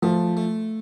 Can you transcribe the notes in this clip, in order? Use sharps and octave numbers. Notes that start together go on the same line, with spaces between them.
F3 A3
A3